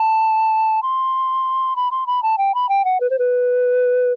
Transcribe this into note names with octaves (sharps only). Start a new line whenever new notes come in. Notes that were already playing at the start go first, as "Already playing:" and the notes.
Already playing: A5
C6
B5
C6
B5
A5
G5
B5
G5
F#5
B4
C5
B4